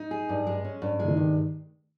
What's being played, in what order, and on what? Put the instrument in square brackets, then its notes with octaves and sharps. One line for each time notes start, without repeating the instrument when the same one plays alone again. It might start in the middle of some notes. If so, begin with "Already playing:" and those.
Already playing: [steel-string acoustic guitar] D#4
G#4
G2
G#3
C#4
G2
[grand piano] E3 [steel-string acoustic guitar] G#3
[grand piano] D#3
[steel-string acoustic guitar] G2